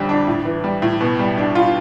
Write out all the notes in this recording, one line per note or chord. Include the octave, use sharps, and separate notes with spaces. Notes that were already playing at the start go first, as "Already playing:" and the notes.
Already playing: F2 D3 G3
D4
A2
E3
G3
A2
B2
G3
D4
F4